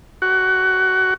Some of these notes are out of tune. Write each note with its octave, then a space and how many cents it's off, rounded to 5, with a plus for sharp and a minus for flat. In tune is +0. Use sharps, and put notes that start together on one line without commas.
F#4 +20